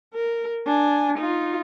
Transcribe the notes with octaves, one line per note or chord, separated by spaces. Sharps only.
A#4
D4 G#5
D#4 F4